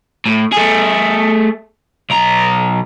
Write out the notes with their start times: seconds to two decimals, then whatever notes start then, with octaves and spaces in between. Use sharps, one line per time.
0.25 A2
0.52 A3 G#4
2.10 B1 A#5